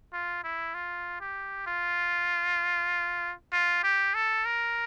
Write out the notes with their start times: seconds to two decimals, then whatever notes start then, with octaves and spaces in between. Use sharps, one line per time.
0.13 F4
0.44 E4
0.74 F4
1.21 G4
1.67 F4
3.52 F4
3.83 G4
4.15 A4
4.46 A#4